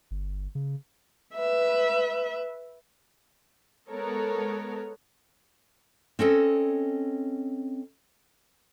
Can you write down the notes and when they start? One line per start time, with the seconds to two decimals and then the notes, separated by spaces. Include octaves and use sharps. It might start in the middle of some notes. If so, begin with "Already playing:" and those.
0.11 G1
0.55 C#3
1.35 B4 E5
3.90 G#3 B3 A4 A#4 C#5
6.19 C4 C#4 A4 D#5